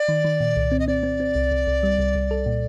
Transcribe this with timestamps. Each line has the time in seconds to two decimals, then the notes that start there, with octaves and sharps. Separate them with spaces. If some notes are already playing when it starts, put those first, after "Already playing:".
Already playing: D5
0.08 D#3
0.24 D#3
0.40 A#2
0.56 C2
0.72 C4
0.79 D#5
0.87 C4 D5
1.03 C4
1.20 C4
1.35 C2
1.51 C2
1.67 C2
1.83 G3
1.99 C2
2.15 C2
2.31 A4
2.46 A#2